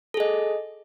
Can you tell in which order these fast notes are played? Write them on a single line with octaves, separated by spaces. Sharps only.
A4 G#4 D#5